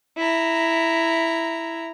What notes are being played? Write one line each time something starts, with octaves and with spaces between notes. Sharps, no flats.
E4 A#5